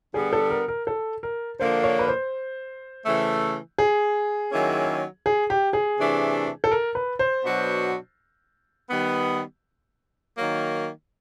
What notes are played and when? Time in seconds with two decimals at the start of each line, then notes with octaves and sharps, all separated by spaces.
0.14 D3 G3 B3 G#4
0.33 A4
0.50 A#4
0.68 A#4
0.87 A4
1.23 A#4
1.60 D3 F3 A#3 D4 C5
1.84 C#5
1.99 B4
2.08 C5
3.06 C#3 E3 A3
3.78 G#4
4.52 D#3 F#3 A#3 C#4 E4
5.26 G#4
5.50 G4
5.73 G#4
5.98 C3 E3 A3 D4
6.64 A4
6.71 A#4
6.95 B4
7.19 C5
7.44 B2 F#3 B3 D4 F#4
8.90 D#3 G3 B3
10.37 D#3 F#3 A#3